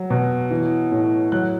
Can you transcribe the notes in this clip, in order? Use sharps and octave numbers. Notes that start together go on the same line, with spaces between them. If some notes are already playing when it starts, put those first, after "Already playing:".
Already playing: F#3
B2
E3
A2
F#3 F#6